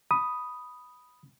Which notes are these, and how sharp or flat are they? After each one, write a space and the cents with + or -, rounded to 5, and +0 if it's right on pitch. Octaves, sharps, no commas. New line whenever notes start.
B5 +0 D#6 +0